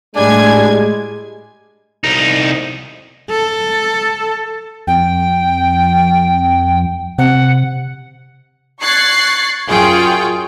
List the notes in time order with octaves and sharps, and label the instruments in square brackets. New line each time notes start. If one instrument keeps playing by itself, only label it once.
[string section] A2 G3 G#6 [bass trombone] G#3 [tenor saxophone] D4 [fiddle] G#5
[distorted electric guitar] C2 D#4
[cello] A4
[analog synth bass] F2 [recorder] G5
[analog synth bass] C3 [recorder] F#5
[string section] C#6 F#6 G#6 A6 C7
F#2 F4 G#4 G5 C#6